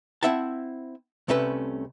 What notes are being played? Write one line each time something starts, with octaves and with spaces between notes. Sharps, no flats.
C4 E4 E5 F#5 A5
C2 C3 A3 C#4 B4